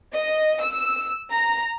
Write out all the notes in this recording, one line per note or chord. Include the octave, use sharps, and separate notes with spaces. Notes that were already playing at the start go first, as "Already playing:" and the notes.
D#5
E6
A#5